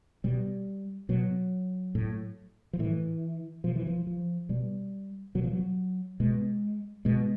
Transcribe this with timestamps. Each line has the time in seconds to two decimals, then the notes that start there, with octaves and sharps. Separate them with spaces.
0.24 B2 G3
1.09 B2 F#3
1.95 A2
2.73 F3
2.79 A2 E3
3.64 B2 F3
3.76 E3
3.87 F3
4.07 F3
4.49 B2 G3
5.35 B2 F#3
5.43 F3
5.53 F#3
6.20 B2 G#3
7.05 B2 G#3